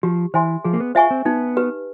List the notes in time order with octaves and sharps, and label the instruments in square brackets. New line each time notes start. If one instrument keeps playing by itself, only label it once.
[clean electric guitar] F3 [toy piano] G4
[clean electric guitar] E3 [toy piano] C5 E5 G#5 C6
[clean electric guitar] F3 [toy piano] G#4
[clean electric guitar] A#3
B3
[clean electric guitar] F4 [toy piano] C5 E5 G#5 C#6
[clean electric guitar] C4
[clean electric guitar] B3 [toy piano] D#4
[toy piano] G4 B4